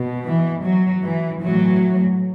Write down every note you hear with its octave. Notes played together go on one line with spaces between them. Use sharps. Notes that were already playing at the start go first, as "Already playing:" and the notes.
Already playing: B2
E3
F#3
E3
A2 E3 F#3